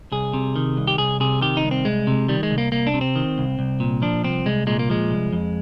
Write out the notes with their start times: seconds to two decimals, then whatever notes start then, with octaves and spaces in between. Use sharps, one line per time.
0.12 C2 G#4
0.33 C3
0.56 D#3
0.77 C2
0.87 G4
0.98 C2 G#4
1.20 C3 G#4
1.41 D#3 G4
1.57 D#4
1.64 C2
1.71 C4
1.85 C2 G#3
2.07 C3
2.28 D#3 G3
2.43 G#3
2.51 C2
2.58 A#3
2.72 C2 A#3
2.87 D4
2.94 C3
3.01 C4
3.16 D#3
3.38 C2
3.59 C2
3.80 A#2
4.02 F3 D4
4.24 C2 C4
4.46 C2 G#3
4.67 A#2 G#3
4.79 A#3
4.90 F3 G#3
5.11 C2
5.33 F2